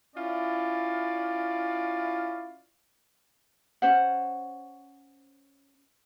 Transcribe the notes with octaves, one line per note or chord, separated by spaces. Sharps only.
C#4 E4 F4 D5
C#4 C5 F#5